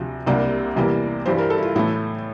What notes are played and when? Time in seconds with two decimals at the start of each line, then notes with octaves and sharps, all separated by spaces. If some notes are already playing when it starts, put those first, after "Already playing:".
Already playing: D2 C3 F3
0.26 C2 C3 G3 A#3 D4
0.76 E2 C3 E3 G3 A#3
1.26 G2 E3 G3 C5
1.38 A#4
1.50 A4
1.58 E4
1.63 F4
1.76 A2 E3 A3 E4